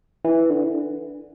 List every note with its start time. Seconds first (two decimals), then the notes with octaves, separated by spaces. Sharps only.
0.25 E3
0.50 D3